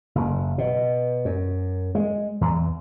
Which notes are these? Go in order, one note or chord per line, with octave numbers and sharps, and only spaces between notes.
F#1
B2
F#2
G#3
E2